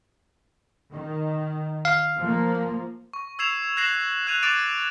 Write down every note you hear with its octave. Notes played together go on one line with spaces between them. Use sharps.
D#3
F5
F3 A#3
C#6
E6 G#6 C7 E7 F7
F#6 G#6 A#6 C7 E7 F#7
F#6 G#6 D#7 F7
D6 F#6 A6 D7 E7 F7